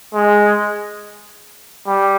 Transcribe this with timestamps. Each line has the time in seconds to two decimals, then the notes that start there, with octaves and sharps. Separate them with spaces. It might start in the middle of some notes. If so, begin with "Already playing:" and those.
0.14 G#3
1.87 G3